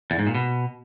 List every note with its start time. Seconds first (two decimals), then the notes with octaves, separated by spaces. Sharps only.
0.11 E2
0.19 G#2
0.27 A#2
0.35 B2